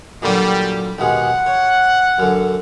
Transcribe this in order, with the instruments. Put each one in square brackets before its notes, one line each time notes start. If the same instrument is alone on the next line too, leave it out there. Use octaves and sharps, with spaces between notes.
[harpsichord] A#2 D3 F#3 [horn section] G3
[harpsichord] D#2 B2 G#3 [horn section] F#5
[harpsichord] C#5
F#2 D3